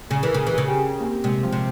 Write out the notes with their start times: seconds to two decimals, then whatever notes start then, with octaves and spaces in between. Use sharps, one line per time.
0.10 C#3 G#4
0.23 E3 A#4
0.34 C#3 G#4
0.47 E3
0.53 C#3 G#4
0.68 G4
1.00 A#3
1.06 C4
1.24 C3 G#3
1.43 F3
1.52 C3